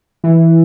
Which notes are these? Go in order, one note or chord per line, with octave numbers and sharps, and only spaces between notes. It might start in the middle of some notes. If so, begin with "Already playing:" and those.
E3